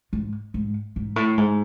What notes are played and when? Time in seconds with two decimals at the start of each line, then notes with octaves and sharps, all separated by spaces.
0.13 G#2
0.54 G#2
0.96 G#2
1.16 A2
1.37 G#2